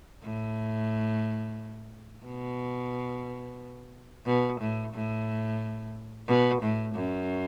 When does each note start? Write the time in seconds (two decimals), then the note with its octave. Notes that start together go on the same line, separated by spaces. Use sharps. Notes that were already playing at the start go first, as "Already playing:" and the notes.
0.23 A2
2.25 B2
4.26 B2
4.61 A2
4.93 A2
6.28 B2
6.62 A2
6.95 F#2